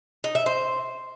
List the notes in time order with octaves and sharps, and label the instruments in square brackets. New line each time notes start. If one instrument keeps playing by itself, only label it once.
[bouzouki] D#4
E5
C5